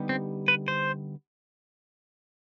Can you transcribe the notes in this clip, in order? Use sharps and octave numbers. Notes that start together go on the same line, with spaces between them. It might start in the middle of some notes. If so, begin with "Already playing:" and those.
Already playing: D3 G3 B3 D#4 G4
C4
B4
C5